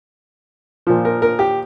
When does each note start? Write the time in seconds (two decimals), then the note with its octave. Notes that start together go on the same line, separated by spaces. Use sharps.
0.87 A#2 F3
1.05 A#4
1.22 A#4
1.39 G4